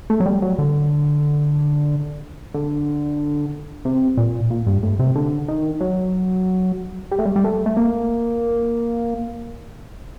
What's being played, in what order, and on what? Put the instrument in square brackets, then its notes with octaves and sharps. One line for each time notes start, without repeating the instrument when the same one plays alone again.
[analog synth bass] A3
F#3
G3
F#3
D3
D3
C3
A#2
A#2
G2
A2
C3
D3
D#3
F#3
G3
A3
G3
G3
A3
A3
A#3